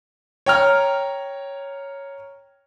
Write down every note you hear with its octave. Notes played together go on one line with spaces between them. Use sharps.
C#5 G5 A#5 F6